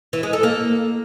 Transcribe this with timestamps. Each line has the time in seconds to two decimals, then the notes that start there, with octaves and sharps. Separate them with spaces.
0.13 E3
0.23 G#3
0.33 A4
0.43 A#3